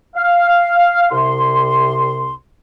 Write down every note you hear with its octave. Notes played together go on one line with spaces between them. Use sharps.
F5
C2 C3 C6